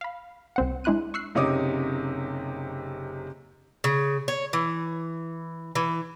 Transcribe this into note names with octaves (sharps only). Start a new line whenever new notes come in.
F5 B5
C2 C4 F#5
G#3 D4 E4 C6 F#6 D#7
C#6 E6 F#6 C7
F#1 C3 D#4 C#5 D6 D#6
C#3
C#5
E3
E3